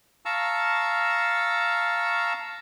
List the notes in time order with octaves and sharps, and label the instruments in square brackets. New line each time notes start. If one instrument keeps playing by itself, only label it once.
[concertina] F5 A5 A#5 C#6 E6